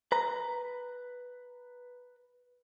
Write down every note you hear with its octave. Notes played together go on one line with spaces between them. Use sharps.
B4 A#5